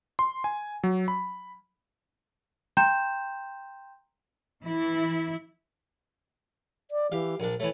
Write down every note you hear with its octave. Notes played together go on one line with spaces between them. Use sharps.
C6
G#5
F#3
B5
G5 A#5 C6 G6 E7
E3 E4
D5
E3 G4 F5
A#1 D4 A#4
E3 A3 C#5